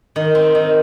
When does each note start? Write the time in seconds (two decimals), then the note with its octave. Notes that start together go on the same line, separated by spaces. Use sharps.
0.16 D#3
0.35 C4
0.55 D#3